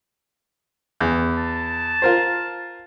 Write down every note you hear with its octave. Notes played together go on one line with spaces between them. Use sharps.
E2
A5
F4 A#4 C5